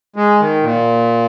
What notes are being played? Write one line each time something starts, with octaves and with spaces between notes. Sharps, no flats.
G#3
D#3
A#2